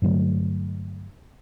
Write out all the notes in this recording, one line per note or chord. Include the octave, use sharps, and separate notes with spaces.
G2 D3 F#3 A3